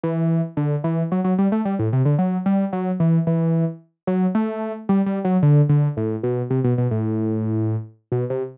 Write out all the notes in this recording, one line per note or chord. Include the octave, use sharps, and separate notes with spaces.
E3
D3
E3
F#3
F#3
G3
A3
G3
A2
C3
D3
F#3
G3
F#3
E3
E3
F#3
A3
G3
G3
F#3
D3
D3
A2
B2
C3
B2
B2
A2
B2
C3